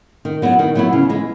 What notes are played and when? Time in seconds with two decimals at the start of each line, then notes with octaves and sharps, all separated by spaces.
0.25 D#3
0.42 F#3 B3 E4
0.59 D#3
0.75 F#3 B3 E4
0.93 C#3
1.09 E3 G#3